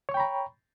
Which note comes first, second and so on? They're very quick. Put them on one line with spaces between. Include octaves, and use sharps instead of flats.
C#5 C#6 G5 B5 A#5